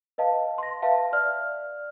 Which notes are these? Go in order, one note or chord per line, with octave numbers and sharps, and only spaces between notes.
B4 D#5 F5 A5
C6 A#6
B4 E5 F5 A5
D5 F6